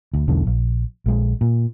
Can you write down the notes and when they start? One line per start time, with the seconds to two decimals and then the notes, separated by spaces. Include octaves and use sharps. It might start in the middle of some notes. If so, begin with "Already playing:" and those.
0.14 D2
0.28 E1 B1 E2 D3
0.46 A#1
1.06 A#1 G#3
1.41 A#2